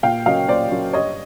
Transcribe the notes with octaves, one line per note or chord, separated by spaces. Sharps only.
A#2 F5 G5
F#3 A#3 C#4 D#5 F5
A#2 C5 D5
F#3 A#3 C#4
G2 C#5 D#5